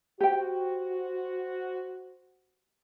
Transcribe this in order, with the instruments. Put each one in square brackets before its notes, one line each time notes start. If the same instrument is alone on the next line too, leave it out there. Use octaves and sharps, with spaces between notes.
[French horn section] F#4 C5 [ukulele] G4 G5